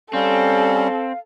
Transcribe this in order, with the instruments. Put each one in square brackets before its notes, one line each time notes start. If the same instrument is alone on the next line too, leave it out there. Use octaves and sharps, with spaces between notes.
[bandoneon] G3 C#4 [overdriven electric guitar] C4 [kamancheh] A4 [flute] F5